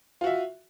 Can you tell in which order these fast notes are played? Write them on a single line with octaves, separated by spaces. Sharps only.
F4 F#4 E5